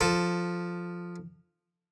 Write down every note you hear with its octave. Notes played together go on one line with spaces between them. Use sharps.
F3 A4